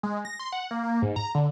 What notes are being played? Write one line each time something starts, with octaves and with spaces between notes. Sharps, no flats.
G#3
A#6
C6
F#5
A#3
A#3
G#2
A#5
D3